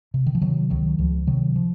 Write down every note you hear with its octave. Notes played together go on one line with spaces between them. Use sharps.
C3
D#3
F3
C3 D#3 F#3
C#2 D#3 F#3
C#2 F3
C3 D#3 F#3
F3